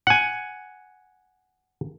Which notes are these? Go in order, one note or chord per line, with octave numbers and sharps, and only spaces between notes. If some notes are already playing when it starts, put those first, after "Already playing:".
F#5 G#5